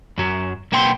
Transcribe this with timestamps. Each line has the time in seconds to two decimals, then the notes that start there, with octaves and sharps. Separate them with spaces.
0.18 F#2 F#3
0.72 B1 A#3 B3 G5 C6